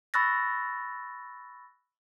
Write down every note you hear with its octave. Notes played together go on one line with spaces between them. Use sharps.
B5 C#6 E6 F#6 A6 A#6